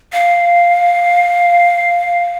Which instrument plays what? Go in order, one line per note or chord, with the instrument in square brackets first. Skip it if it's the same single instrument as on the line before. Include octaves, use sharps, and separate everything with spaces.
[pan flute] F5